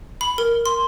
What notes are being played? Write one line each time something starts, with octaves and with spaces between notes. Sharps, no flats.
B5
A#4
C6